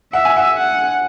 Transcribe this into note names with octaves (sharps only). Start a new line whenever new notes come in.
E5 F#5
G#5
F#5
F#5